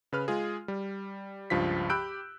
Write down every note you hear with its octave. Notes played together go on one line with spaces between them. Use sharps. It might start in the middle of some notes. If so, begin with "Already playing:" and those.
C#3 B4 F6
G#3 F4 G#4
G3
C#2 G2 F3 F4 B6
G4 B5 E6 F#6 G6 D7